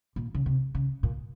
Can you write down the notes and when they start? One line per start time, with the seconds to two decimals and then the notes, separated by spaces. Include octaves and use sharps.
0.16 A#2
0.34 C#3
0.46 C3
0.75 C#3
1.03 A#2